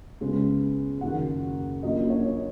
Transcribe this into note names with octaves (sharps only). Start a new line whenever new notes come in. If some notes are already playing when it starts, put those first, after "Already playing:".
C#2 C#3 G#3 B3
F#1 F#2 D#3 F#5
A#1 A#2 F#3 A#3 C#4 D#5
C#5